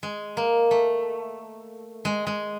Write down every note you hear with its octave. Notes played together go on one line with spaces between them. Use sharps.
G#3
A#3
A3
G#3
G#3